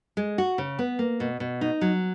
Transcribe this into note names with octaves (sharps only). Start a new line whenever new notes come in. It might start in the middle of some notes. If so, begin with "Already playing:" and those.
G#3
F#4
C#3
B3
A#3
B2
B2
D#4
F#3